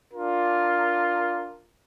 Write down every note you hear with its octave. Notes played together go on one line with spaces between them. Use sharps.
D4 F4 A#4